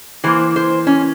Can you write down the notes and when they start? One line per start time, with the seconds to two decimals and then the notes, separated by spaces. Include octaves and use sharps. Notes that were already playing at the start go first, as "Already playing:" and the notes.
0.24 E3 A#3 C5
0.56 C5
0.87 C#4